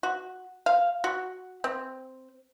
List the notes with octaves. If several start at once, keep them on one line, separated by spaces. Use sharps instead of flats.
F#4
F5
F#4
C4